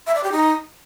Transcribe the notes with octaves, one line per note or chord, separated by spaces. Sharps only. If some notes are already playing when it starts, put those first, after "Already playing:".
E5
D5
G4
D#4